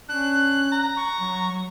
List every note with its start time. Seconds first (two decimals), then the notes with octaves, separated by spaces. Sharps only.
0.09 C#4 D4 F#6
0.72 A#5
0.97 C#6
1.20 F#3
1.52 F#3